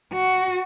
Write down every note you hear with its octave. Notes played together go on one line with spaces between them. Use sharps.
F#4